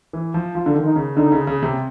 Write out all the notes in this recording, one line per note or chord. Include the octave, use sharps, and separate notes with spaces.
E3
F3
F3 F4
D3
D#3
D#4
C#3
D3 D#4
C#3
C#3
C3